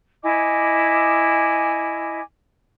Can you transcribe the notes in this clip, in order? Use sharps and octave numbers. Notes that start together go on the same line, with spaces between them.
E4 D#5 G#5 D6